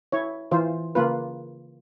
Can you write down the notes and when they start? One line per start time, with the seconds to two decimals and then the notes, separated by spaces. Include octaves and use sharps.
0.12 E4 C#5
0.51 E3 F4 C5
0.95 C#3 A#3 F4 B4